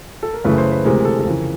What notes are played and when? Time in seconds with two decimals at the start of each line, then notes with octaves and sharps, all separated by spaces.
0.23 A4
0.33 A#4
0.44 F#2 C#3 E3 A3 B4
0.58 C5
0.72 B4
0.84 D2 C3 E3 G#3 A#4
1.05 A4
1.19 A4
1.25 F2 C#3 E3 A#4